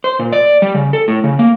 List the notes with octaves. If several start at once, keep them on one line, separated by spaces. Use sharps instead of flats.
C5
A#2
D5
G3
C#3
A4
A2
C#3
A#3